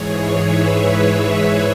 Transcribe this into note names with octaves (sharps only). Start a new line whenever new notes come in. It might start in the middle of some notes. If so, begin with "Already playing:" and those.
Already playing: G#2 E3 G#4 C#5
B4 E5
B4 E5
G#4 C#5